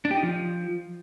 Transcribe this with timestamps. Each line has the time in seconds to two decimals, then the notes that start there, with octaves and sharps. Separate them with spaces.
0.05 D4
0.11 G4
0.17 D#4
0.23 F3